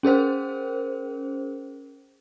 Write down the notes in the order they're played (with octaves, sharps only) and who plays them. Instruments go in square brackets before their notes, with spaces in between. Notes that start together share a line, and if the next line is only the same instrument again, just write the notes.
[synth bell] C#4 G#4 A#4 C5